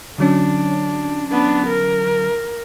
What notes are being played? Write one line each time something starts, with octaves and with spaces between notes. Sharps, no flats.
D3 F#3 C#4 D4
B3 D4
A#4